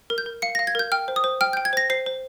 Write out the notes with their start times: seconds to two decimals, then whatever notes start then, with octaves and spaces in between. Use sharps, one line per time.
0.10 A#4
0.18 G6
0.26 A#4
0.42 F5 C#7
0.55 A#6
0.59 F5
0.67 G#6
0.75 A#4 G6
0.92 G5 F6
1.08 C5
1.16 D#6
1.24 C5
1.41 G5 F6
1.53 G6
1.57 G5
1.65 G#6
1.73 C5 A#6
1.90 C5 C7
2.06 C5